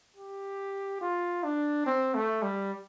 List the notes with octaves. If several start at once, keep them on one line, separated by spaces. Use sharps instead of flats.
G4
F4
D4
C4
A3
G3